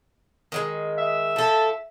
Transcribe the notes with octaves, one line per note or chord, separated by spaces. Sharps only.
D#3 F#3 G#3
E5
F3 A4